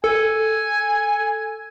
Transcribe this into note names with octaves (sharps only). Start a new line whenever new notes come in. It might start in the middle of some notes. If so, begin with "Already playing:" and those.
A4 G#5